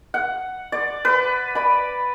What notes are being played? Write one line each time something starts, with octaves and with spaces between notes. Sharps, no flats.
F#5
D5
B4
D5 B5